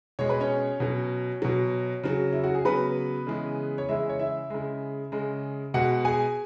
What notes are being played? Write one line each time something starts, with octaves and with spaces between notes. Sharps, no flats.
B2 G#3 C#5
B4
C#4 C#5
B2 F#3
B2 F#3
C#3 F#3
E4
F#4
G#4
C#3 F#3 B3 B4
C#3 E3 G#3
C#5
C#3 E3 G#3 E4 E5
C#5
E4 E5
C#3 G#3
C#3 G#3
B2 G#3 F#4 F#5
G#4 G#5